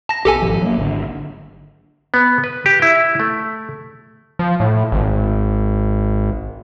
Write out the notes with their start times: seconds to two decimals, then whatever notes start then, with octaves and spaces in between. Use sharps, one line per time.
0.09 A5 A#6
0.25 B1 G4 A4 G#5
0.42 G#1 F3
0.62 F#3 A3 A#3
0.78 G#1 D3
2.14 B3
2.44 B4
2.66 G4
2.82 E4
3.20 A3
4.39 F3
4.60 A2
4.92 G#1